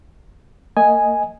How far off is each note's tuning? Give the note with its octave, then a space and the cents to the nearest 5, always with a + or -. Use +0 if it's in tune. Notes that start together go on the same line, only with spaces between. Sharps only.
A#3 -30 D#5 +5 G#5 +0